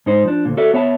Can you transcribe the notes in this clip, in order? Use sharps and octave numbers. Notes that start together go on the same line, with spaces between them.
G#2 D#4 C5
F3 D4
D2 A#2
F#4 A4 D5 E5
B3 C#5 E5 A5